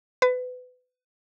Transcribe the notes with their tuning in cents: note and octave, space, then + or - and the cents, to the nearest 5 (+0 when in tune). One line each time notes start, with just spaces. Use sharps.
B4 +25